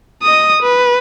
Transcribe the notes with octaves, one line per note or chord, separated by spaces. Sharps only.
D#5 D#6
B4